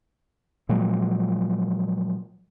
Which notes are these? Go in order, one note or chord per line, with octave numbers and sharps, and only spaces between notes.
A#2 F3 F#3 G#3